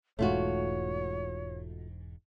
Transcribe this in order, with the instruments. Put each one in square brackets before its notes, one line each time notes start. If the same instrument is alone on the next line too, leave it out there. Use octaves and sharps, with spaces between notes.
[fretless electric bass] E1 G#2 [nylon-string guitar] A3 F4 F#4 [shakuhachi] C#5